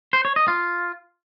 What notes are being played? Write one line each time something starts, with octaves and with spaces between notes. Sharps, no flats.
C5
C#5
D#5
F4